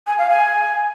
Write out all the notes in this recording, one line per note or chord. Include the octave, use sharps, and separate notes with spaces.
G#5
F5
G#5